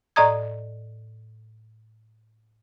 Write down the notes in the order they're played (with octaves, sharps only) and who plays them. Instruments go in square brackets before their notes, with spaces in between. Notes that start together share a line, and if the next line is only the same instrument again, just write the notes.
[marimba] A2 D5 D#5 A#5 D#6 G#6